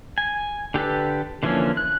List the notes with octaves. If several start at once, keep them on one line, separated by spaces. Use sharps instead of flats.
G#5
D3 G4 A4 B4
D3 E3 F3 A#3 C#4
F#6